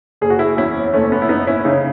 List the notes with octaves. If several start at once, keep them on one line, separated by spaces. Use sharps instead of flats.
F#1 G#4
F#4
E4 G#4
E2 C#4 E4
F#1 A3 C#4
B3
E4
F#1 B3 D#4
C#4 E4
C#3 D#4
C#4